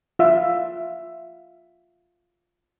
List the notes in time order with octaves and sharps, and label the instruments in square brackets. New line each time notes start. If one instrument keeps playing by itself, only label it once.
[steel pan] F4 E5 F5